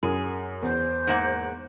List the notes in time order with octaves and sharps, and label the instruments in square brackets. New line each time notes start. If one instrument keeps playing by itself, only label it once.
[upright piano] F#2 [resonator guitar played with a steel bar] G#4
[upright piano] E2 [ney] C5
[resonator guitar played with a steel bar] G#2 A#3 F#5